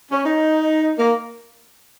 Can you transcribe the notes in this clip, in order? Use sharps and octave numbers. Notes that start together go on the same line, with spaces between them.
C#4
D#4
A#3